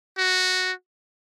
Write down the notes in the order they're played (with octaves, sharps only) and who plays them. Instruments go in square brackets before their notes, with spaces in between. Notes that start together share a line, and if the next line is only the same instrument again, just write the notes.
[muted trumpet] F#4